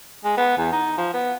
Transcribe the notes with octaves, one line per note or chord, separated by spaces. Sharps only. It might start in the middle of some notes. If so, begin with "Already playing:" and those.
G#3
B3
E2
D#4
F3
B3